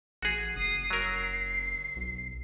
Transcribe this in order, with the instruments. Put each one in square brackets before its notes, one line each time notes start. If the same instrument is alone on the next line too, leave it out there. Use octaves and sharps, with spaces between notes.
[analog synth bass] A1 [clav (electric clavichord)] F#4 G#4
[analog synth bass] F#1 [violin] D#6 C7
[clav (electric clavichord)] F#3 A#4 [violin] C7
[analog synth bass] B1